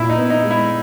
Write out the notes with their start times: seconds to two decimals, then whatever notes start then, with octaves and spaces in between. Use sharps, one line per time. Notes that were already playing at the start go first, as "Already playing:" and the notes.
Already playing: A#2 E4
0.10 D#4
0.16 B3
0.30 D#4
0.44 G#3
0.51 E4